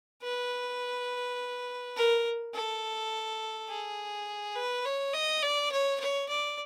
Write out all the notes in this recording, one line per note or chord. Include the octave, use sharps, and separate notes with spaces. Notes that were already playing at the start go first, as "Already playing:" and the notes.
B4
A#4
A4
G#4
B4
C#5
D#5
D5
C#5
C#5
D5